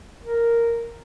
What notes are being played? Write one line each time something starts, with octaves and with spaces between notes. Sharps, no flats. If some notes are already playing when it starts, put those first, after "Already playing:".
A#4